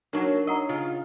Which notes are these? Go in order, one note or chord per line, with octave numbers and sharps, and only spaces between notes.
F#3 A#3 D4 D#4 F#5
A#4 D#5 F#5 A#5
C#3 F4